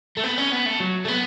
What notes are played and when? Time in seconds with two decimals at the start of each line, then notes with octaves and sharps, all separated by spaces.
0.17 A3
0.24 B3
0.38 C#4
0.52 B3
0.66 A3
0.80 F#3
1.05 A3
1.08 B3